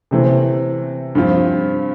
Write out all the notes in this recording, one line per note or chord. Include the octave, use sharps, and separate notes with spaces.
C3 E3 A3 C4
G2 F3 C4 F4